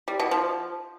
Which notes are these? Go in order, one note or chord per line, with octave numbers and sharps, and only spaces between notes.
G3
B2
F3